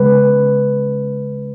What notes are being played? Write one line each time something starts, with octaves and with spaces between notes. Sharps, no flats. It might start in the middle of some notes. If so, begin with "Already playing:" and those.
Already playing: C#3 G#3 B4